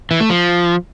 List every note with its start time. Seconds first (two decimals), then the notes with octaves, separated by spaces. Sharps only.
0.11 E3
0.20 A3
0.30 F3